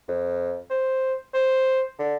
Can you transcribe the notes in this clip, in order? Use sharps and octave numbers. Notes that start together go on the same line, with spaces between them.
F2
C5
C5
D3